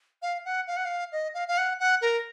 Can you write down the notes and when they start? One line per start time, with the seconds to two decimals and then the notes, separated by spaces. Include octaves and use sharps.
0.22 F5
0.45 F#5
0.67 F5
0.77 F#5
0.85 F5
1.12 D#5
1.34 F5
1.48 F5
1.58 F#5
1.80 F#5
2.01 A#4